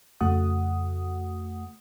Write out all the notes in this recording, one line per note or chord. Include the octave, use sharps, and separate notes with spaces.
F2 C#3 A3 F#4 F#5 D#6